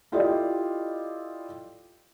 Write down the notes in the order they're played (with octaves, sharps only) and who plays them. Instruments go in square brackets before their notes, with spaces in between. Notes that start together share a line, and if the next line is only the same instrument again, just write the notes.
[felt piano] E4 F4 G4 A4 D5 D#5